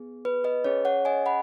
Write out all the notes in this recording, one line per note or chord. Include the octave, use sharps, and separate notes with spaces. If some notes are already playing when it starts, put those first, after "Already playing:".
Already playing: B3 G#4
B4
B4 D#5
C#4 G#4 C#5
C#5 F#5
D#5 G#5
F#5 B5